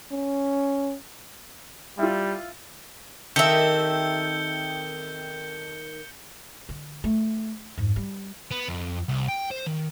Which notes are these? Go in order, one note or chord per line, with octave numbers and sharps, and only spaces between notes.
C#4
G3 E4 F4
D#3 C4 G4 A4 E5 G6 C#7 G7
D3
A3
F2 G#2
G3
B3
F2
C2
G5
C5
D#3